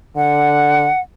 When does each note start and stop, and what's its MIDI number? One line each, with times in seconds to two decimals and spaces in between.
0.16 0.89 50
0.16 1.00 78